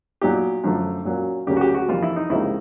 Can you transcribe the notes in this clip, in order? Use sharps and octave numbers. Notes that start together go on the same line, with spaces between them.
A#2 F#3 B3 D#4 G4
F#2 D3 F3 A3
A#2 F#3 A#3 C#4
D2 C#3 F#3 A#3 C#4 G4
F#4
G4
F#4
F2 C3 E3 G3 A#3 F4
E4
D#4
C#2 C3 F3 A#3 D#4 E4